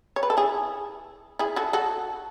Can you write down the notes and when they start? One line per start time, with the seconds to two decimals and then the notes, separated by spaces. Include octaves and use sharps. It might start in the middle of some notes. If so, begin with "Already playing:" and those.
0.16 C#5
0.23 B4
0.30 A4
0.37 E4 G#4
1.39 E4 G#4
1.56 F#4 A4
1.73 F#4 A4